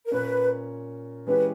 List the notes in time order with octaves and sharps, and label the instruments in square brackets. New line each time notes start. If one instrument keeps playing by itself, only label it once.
[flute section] A#4
[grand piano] A#2 A#3 C#4 [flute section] B4
[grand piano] E3 G#3 C#4 G4 [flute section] B4